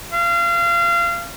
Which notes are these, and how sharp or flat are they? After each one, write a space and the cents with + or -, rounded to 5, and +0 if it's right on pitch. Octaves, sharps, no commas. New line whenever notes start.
F5 -30